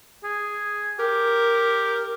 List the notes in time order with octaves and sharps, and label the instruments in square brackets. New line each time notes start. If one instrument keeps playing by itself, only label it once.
[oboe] G#4
[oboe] G4 [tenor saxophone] A#4